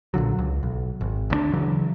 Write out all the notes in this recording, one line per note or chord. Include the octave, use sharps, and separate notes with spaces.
B1 A#2 D3 F#3
C#2
B1
G#1
D2 D#3 D4
C#3 E3 F#3